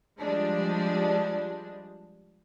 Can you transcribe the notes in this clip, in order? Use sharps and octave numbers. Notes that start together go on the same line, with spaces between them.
F3 G3 G#3 D4